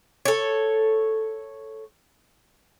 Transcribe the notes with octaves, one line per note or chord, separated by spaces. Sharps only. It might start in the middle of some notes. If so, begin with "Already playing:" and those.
A4 C#5